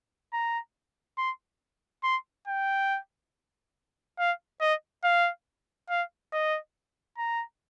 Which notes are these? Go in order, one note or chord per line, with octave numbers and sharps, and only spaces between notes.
A#5
C6
C6
G5
F5
D#5
F5
F5
D#5
A#5